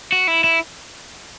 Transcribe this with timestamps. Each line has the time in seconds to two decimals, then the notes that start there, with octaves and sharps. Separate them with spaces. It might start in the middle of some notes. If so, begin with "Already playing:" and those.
0.12 F#4
0.28 E4
0.44 E4